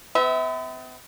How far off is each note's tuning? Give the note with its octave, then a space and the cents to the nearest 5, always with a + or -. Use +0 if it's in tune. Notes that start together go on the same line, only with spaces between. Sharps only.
B3 +45 E5 -25